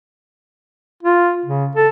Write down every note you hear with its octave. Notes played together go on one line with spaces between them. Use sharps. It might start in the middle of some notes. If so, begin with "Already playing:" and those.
F4
C#3
A4